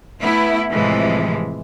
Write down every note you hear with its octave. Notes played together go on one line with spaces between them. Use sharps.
A3 B3 E4
A2 C3 E3 F3 G#3